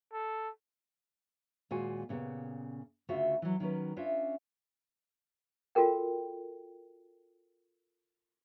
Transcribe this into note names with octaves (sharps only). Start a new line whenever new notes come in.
A4
D#2 A#2 G#3 F#4 G#5
A#2 C#3 B3 G4
D2 C#3 F4 F#4 E5
E3 F#3
D#3 F#3 C#4 B4
C#4 D4 F4 E5
F4 F#4 A4 A#4 G5